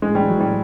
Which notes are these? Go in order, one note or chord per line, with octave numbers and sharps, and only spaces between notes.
A2 G#3
G3
E3
F#3
A2 G3